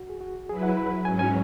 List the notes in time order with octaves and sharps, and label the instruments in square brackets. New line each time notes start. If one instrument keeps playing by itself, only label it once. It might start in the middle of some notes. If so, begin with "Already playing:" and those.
Already playing: [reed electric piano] F#4
G#4
F#4
[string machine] F#3 E4 B4 [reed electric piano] G#4
[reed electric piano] F#5
B5
[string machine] G#2 F#3 C#4 [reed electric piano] G#5
[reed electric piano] G#5